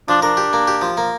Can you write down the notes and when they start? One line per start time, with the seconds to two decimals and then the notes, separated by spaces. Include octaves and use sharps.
0.08 F3 D4
0.22 D4 A#4
0.37 G4
0.53 A#3
0.68 G4
0.81 F3
0.97 A#3